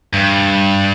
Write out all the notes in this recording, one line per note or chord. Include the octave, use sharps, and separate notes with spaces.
G2